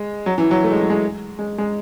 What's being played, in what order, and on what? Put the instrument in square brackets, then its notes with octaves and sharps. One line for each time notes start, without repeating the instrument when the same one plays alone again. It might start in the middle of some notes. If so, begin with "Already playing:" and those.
Already playing: [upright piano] G#3
F#3
E3
F#3
A3
G#3
F#3
G#3
G#3
G#3